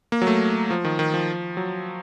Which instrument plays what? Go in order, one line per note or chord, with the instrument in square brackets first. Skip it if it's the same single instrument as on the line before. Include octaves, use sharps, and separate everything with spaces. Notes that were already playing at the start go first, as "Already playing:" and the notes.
[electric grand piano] A#3
F#3
A3
F3
D#3
D#3
F3
F#3